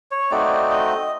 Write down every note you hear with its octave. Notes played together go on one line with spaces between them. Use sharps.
C#5
A3 C4 D#4 F#4 D5
D#5